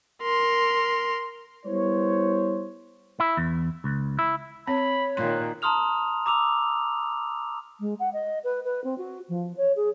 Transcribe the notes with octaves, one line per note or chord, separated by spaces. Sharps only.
A#4 C6
G3 B3 E4 C5 C#5
E4
E2
C#2
E4
C4 C#5 B5
A#2 D#3 C6 F#6
A5 A#5 C6 D#6 F6 F7
A#5 D6 E6 F7
G#3
F#5
D#5
B4
B4
C4
F#4
F3
C#5
G#4